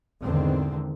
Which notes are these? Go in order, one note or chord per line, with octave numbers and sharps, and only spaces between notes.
E2 G#2 D3 D#3 C4